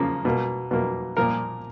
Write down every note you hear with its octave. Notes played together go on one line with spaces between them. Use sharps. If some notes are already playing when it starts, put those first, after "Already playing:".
Already playing: C#3 F3 A#3
B2 A#3
B2 A#3
A#2 F3 A#3 A#4